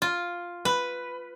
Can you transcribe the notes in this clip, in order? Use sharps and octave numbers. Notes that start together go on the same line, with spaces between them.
F4
B4